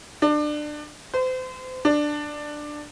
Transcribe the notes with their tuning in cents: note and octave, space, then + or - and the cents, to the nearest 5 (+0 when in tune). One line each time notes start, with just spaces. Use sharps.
D4 +25
C5 -35
D4 +10